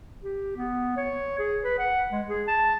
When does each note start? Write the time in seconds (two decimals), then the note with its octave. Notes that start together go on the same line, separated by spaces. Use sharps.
0.23 G4
0.57 B3
0.97 C#5
1.39 G#4
1.63 B4
1.79 F#5
2.12 G#3
2.29 G#4
2.48 A5